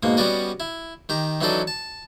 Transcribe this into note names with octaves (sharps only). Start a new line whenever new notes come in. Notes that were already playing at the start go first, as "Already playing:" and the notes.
G#2 B2 A#3
G3 B3 C#4 F#4 D5 D#5
E4
D#3 G4 A#5
E3 F#3 C#4 D#4 A4 D5
A5